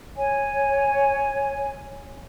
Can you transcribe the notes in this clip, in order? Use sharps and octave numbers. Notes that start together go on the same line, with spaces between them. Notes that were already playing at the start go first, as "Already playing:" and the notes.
C#5 G#5